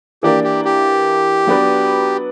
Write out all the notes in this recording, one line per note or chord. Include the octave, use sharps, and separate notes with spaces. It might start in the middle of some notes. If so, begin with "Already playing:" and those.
E3 A#3 D4 G4
G4
G4
F#3 B3 D4 F#4 B4